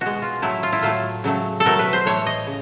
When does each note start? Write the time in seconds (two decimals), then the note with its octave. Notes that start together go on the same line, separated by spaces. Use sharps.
0.01 B2 G#3 F#4
0.22 F4
0.42 A2 F#3 A3 E4
0.63 F4
0.73 E4
0.82 A2 F#3 A3 F4
1.24 C#3 F#3 A3
1.60 A4
1.65 B2 F#3 A3 A#4
1.79 B4
1.93 C5
2.06 A2 E3 A3 C#5
2.26 D#5
2.47 C#3